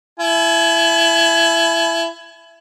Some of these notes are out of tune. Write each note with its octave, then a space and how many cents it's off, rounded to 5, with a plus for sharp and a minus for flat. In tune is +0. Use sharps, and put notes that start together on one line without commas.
E4 +20 G#5 +45